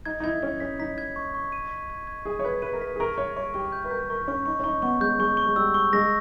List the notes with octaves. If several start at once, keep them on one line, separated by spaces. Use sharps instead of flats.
D#4 G#6
D#4
E4 G#6
C#4 G#6
C#4 B6
D#4 B6
G#6
C#6
C#6
D#7
B6
G#6
G#6
G#4 G#6
C#5
B4 G#6
B4 D#7
A#4
B4 B6
G#4
A#4 C#6
C#5 C#6
C#5 C#6
G4 C#6
G6
B4
A#4 G6
A#4 C#6
C#4 C#6
D#4 C#6
C#4
D#4 C#6
B3 C#6
G#3 G6
G#3 C#6
C#6
G#3
G3 E6
C#6
G#3 A#6